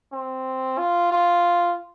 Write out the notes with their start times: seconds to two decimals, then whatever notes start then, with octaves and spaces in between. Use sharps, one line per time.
0.12 C4
0.78 F4
1.12 F4